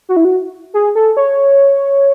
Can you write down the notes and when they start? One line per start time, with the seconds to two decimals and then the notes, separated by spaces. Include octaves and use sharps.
0.09 F#4
0.17 E4
0.25 F#4
0.74 G#4
0.95 A4
1.17 C#5